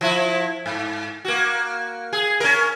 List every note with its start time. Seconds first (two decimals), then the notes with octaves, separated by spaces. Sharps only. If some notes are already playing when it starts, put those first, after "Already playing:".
0.01 F3 E4
0.66 G#2
1.25 A#3 F#4
2.13 G#4
2.40 C#4 A#4